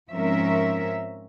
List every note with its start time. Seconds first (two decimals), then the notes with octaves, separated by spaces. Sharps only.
0.11 G#2 F3 C4 C#4 A#4 E5